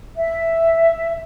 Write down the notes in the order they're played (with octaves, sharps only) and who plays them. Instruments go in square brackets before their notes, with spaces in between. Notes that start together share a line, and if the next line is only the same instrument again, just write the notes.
[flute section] E5